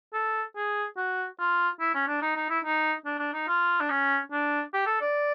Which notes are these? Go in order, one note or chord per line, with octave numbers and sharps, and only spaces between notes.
A4
G#4
F#4
F4
E4
C#4
D4
D#4
D#4
E4
D#4
D4
D4
D#4
F4
D4
C#4
D4
G4
A4
D5